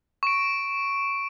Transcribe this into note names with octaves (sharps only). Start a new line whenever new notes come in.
C#6 D7